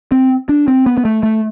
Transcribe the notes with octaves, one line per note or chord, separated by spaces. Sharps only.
C4
D4
C4
B3
B3
A3
A3